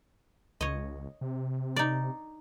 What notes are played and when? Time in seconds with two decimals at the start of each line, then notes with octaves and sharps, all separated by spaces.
0.61 C#2 C#5 D#5
1.21 C3
1.76 D#4 D5